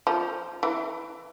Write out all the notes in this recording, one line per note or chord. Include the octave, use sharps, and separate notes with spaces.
F3
E3